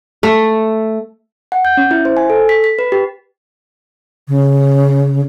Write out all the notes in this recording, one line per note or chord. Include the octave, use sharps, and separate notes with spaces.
A3
F#5
G6
C#4
E4
C5
G#5
A4
B6
B6
B4
G4
C#3